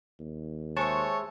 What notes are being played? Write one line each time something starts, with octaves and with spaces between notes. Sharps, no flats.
D#2
G#3 C5 C#5 E5 A5 C#6